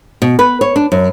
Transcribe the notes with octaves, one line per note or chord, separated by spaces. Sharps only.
B2
B4
C#5
D4
F#2